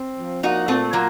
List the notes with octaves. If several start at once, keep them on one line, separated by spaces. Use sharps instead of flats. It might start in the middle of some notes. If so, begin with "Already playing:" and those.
Already playing: C4
F3
A#3 D#4 F#4
A#2 A3 C4
F#3 A#3 F4